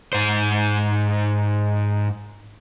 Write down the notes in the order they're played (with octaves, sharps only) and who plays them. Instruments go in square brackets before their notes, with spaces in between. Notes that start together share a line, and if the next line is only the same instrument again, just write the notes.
[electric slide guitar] G#2 C5